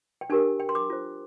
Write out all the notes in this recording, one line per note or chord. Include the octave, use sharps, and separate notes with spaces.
G5
D4 G4 A#4 G#5
G5
C6
D6
F4 C5